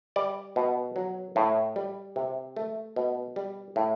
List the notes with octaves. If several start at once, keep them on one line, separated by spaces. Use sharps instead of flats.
G3 D5
B2
F#3
A2
G3
C3
A3
B2
G3
A2